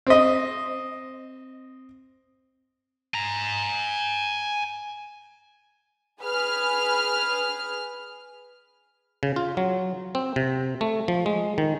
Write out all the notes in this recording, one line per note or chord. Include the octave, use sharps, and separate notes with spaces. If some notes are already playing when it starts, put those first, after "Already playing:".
C4 D#5
G#5 A#5
G#4 B4 F6
C#3
F4
F#3
C4
C3
A3
F3
G#3
D#3